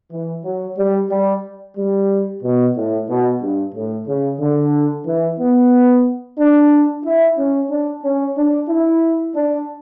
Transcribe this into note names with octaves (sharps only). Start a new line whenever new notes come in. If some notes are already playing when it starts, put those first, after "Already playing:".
E3
F#3
G3
G3
G3
B2
A2
B2
G2
A2
C#3
D3
E3
B3
D4
E4
C#4
D4
C#4
D4
E4
D4